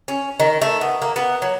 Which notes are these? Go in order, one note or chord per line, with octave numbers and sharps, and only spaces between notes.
C#4
D#3
A3
B3
A#3
B3
F#3